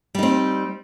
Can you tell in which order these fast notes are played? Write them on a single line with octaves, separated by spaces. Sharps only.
G3 D#4 C4